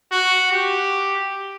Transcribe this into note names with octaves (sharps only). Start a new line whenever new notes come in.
F#4
G4